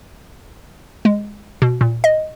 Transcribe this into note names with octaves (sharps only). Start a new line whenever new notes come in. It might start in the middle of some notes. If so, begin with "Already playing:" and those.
G#3
B2
A#2
D#5